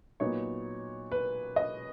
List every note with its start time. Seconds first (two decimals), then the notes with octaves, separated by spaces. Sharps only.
0.20 A#2 F#3 B3 D#4 C#5
1.12 B4
1.56 D#5